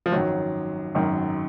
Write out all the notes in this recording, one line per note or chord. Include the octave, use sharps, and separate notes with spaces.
F3
G#1 F#2 D#3 F#3
G#1 F#2 D#3